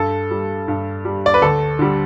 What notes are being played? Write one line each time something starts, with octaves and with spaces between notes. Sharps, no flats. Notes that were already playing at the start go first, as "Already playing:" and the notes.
Already playing: G2 A4
G3
G2
G3
D5
B4
D2 A4
D3 G3